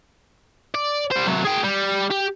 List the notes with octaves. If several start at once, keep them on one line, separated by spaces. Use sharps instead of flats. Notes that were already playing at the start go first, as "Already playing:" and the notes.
D5
G3 C5
C3 F#3
G#4 G5
G3
G4